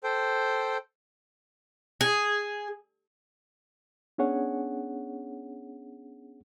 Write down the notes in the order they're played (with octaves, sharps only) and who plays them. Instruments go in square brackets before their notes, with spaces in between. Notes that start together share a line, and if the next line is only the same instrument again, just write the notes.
[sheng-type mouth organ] A4 C5 G5
[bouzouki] G#4
[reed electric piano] B3 C#4 D4 G#4 C#5 F#5